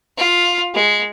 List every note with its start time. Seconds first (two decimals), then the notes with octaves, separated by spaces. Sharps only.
0.17 F4
0.74 G#3